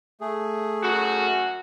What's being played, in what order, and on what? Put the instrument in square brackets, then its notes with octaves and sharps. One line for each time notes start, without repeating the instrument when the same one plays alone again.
[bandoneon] A3 G#4
[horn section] F#2 F#4